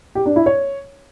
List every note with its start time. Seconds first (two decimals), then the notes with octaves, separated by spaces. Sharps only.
0.15 G4
0.26 D4
0.36 E4
0.46 C#5